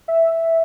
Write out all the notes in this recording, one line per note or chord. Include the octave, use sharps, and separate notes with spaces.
E5